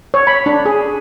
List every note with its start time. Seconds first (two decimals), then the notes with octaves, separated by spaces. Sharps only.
0.14 C#5
0.27 B5
0.46 D4
0.66 G#4